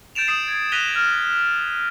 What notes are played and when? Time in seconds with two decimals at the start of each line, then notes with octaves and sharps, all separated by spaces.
0.15 G6 A6 D7 E7 F7
0.27 D#6 C7 E7
0.48 G#6 C7
0.72 F#6 A#6 B6 D#7 F7 G7
0.96 F6